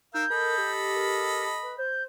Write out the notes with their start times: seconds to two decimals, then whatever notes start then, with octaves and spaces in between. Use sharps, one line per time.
0.14 D#4 A#4 F5 E6 G6
0.30 A4 A#4 D#5 B5
0.58 G4
0.94 A#4
1.63 B4
1.78 C5 G6